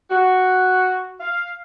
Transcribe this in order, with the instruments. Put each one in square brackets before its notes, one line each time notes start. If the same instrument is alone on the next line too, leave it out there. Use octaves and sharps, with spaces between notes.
[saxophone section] F#4
F5